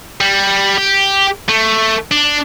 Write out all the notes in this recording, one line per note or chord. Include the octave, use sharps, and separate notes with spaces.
G3
G4
A3
D4